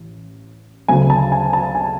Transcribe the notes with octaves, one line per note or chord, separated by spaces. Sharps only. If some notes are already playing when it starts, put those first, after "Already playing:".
Already playing: A1
D2 C#3 F#3 A3 G#5
A5
G#5
A5
G#5